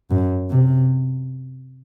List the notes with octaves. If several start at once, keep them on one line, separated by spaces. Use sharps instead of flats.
F#2
C3